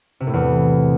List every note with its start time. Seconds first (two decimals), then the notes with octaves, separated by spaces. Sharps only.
0.20 C3
0.27 A2
0.33 E2